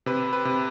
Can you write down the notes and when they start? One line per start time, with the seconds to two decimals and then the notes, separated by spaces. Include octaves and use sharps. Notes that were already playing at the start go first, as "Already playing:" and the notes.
0.06 C3 B4
0.33 B4
0.45 C3